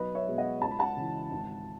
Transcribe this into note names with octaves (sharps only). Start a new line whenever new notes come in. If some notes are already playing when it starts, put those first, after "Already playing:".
Already playing: B1 B4 D#5
C#5 E5
B2 G#3 B3
D#5 F#5
C#2 A5
B5
F#5 A5
C#3 E3
G#1